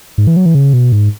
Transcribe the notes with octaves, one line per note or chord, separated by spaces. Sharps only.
G#2
E3
F#3
E3
C#3
B2
G#2